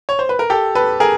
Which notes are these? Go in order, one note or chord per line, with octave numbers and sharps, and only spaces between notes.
C#5
C5
B4
A#4
G4 A4
A4 B4
G#4 A#4